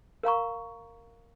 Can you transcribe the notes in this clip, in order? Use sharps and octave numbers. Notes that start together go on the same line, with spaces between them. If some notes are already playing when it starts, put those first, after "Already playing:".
A#4 F5 A#5 C#6